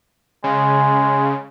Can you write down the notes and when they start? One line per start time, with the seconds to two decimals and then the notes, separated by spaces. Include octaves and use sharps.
0.44 C#3 G#3